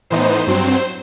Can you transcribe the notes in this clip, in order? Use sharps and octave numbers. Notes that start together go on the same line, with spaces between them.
A2 E3 B3 D#4 C5
G2 F#3 C4